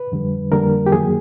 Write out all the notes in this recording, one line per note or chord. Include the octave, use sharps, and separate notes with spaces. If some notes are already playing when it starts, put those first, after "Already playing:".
Already playing: B4
F2 D3 G3
F2 D3 G3 A#3 A#4
G4
F#2 D#3 F#3 A#3 G#4